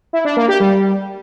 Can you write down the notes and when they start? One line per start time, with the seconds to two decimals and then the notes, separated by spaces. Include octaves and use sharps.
0.13 E4
0.25 D4
0.37 A#3
0.48 G4
0.60 G3